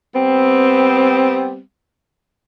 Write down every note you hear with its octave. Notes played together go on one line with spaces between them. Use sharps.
G3 B3 C4